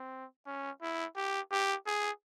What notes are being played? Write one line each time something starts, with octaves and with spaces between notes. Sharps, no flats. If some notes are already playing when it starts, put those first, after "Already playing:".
Already playing: C4
C#4
E4
G4
G4
G#4